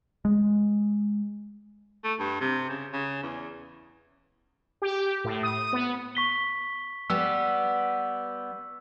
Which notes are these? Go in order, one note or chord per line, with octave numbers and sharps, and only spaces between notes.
G#3
A3
G2
C3
C#3
C#3
E2
G4
A2
D#6
B3
C#6 B6 G7
G3 B3 G4 E6